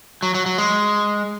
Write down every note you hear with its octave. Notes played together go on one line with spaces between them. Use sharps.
F#3
F#3
F#3
G#3